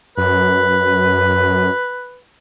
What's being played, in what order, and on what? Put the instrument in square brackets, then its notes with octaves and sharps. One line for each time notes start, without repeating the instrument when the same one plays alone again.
[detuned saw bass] F#2 [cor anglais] B4